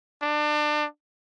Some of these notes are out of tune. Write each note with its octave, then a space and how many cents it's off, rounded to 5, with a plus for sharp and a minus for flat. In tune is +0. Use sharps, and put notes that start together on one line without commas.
D4 +30